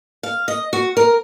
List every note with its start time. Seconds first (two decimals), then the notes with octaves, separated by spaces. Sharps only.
0.23 F5
0.48 D#5
0.73 F#4
0.97 A#4